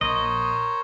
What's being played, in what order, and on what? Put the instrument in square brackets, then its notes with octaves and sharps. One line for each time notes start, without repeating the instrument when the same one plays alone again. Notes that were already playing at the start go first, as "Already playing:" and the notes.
[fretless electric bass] A#1 [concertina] A#4 C5 C#5 [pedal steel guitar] D#5